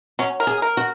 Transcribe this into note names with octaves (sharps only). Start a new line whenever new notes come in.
F#3 C#4
A#4
G#4
A#4
F#4